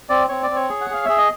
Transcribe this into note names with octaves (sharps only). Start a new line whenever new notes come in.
C4 D5
C4 C#5
D5
C4
C#5
G#4
F#5
G#4 F5
G#4 E5
D#5